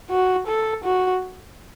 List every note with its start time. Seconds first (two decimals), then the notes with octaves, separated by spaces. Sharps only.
0.10 F#4
0.47 A4
0.84 F#4